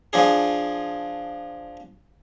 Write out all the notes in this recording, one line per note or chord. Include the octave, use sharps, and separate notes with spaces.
F3 D4 G#4